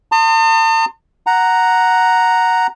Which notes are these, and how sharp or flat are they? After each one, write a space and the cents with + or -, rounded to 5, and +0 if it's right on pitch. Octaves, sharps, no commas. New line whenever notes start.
A5 +45 C6 +0 D#6 -20
F#5 +0 A#5 +0